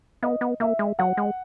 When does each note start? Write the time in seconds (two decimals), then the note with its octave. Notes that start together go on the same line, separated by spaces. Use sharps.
0.23 B3 D#5
0.41 B3
0.60 A#3 E5
0.79 G#3
0.99 F#3 F#5
1.17 G#3